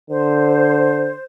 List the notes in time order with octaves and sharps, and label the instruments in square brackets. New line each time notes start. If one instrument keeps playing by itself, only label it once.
[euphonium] D3 [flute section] C5